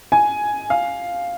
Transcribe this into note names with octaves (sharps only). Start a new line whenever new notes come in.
G#5
F5